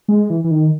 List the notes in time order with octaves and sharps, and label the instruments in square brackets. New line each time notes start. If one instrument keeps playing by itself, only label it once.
[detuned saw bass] G#3
E3
E3
D#3